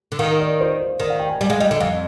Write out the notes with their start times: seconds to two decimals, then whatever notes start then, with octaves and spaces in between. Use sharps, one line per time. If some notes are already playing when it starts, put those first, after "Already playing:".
0.12 D3
0.19 D#3 F5
0.40 D5
0.60 C5
0.80 C5
1.00 D#3 D5
1.10 F5
1.20 G5
1.30 G#5
1.41 G3 G#5
1.50 G#3 F5
1.60 G3 D#5
1.70 D3 D#5
1.80 F2 F5